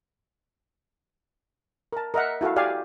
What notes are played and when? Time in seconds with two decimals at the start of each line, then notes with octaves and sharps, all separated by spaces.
1.93 A#4 A5
2.14 A#4 D#5 E5 F#5
2.41 E4 F#4 A4 F5
2.56 G4 D5 F5 G#5